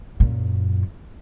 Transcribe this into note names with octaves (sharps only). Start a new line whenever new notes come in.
F#2 A#2